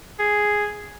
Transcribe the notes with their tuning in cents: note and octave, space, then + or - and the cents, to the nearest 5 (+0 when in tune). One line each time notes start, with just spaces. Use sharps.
G#4 +0